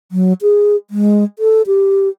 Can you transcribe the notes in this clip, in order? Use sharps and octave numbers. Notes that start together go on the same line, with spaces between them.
F#3
G#4
G#3
A4
G4